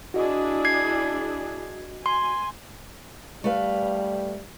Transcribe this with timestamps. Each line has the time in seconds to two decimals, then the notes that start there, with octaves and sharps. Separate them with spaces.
0.14 D4 E4 F#4 G#4 D#5
0.65 G#6 C7
2.06 G#5 C6
3.44 G3 A3 B4 F5